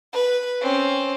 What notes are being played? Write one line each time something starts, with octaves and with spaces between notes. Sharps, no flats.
B4
C4 C#4